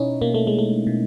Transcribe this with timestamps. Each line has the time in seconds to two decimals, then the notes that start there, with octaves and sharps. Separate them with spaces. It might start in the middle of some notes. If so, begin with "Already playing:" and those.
Already playing: B2 C#4 D#4 E4
0.21 B2 A#3
0.34 A3
0.47 G#3
0.59 A3
0.87 B2